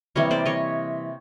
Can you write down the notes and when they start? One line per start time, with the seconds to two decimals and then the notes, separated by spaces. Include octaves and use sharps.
0.15 C3 E3 G3 A#3 C#5 D#5
0.31 C5 D5
0.46 C#5 D#5